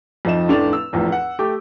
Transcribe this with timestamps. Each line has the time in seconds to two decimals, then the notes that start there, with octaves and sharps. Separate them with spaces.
0.25 F2 F3 D#4 E7
0.48 F1 A2 A3 D4 D5 F7
0.73 E6
0.93 F1 E2 A2 F3
1.12 F#5
1.39 A3 G4 D6